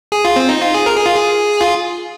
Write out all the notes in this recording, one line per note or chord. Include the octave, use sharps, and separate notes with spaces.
G#4
F4
C4
D#4
F4
G#4
A#4
G#4
F4
G#4
F4